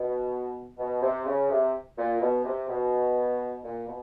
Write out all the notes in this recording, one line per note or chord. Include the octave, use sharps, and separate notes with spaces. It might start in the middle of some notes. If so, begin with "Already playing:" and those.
Already playing: B2
B2
C3
C#3
C3
A#2
B2
C3
B2
A#2
B2